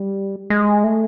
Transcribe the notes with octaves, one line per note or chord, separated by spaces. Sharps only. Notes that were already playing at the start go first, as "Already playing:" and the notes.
Already playing: G3
G#3
A3